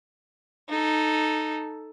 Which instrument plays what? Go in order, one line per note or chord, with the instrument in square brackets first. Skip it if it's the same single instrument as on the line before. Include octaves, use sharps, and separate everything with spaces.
[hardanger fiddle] D#4 A4